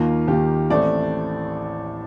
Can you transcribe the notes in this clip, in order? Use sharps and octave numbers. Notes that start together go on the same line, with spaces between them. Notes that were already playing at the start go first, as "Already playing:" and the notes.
Already playing: D#2 D#3 A#3 F4
D#2 D#3 A#3 G4
A1 A2 A3 C4 D5